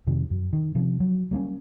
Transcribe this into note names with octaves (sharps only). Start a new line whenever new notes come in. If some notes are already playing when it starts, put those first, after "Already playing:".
F2 C3 D#3
F#2
D#3
C3 F3 C#4
F#3
G3 A#3 B3 C#4